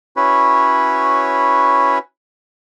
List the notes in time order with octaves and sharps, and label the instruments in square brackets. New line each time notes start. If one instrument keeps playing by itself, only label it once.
[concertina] C#4 E4 F#4 B4 C#5